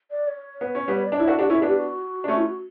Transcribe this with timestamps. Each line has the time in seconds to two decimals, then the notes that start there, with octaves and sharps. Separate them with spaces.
0.11 D5
0.28 C#5
0.61 B3
0.75 C#4
0.88 G3 B3
0.94 C#5
1.06 D5
1.12 D4
1.17 E4 C#5
1.27 D4 F#4 A4
1.39 D4 F#4 G4
1.49 C#4 E4 A4
1.61 B3 D4 F#4
1.68 G4
1.76 F#4
2.24 D4
2.28 A3 C#4 F#4
2.38 E4
2.46 F#4